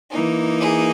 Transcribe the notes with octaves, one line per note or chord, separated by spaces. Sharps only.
E3 A#3 D#4
G#4